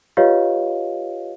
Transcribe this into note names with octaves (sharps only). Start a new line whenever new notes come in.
F4 G4 B4 C#5 D#5 F5